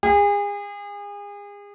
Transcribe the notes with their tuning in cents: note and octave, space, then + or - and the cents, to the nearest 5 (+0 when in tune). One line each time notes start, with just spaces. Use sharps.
G#4 -35